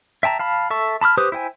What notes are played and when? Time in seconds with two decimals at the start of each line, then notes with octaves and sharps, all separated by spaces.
0.23 E5 G5 A5 A#5
0.39 F5 A5 B5
0.70 A4 E5 A5 C#6
1.01 A5 B5 D6 F6
1.17 G4 B4 C5 D6 D#6
1.32 E4 C5 G5 G#5